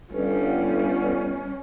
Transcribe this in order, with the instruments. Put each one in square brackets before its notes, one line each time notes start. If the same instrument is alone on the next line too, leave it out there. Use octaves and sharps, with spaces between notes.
[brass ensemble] G1 [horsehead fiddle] G3 C#4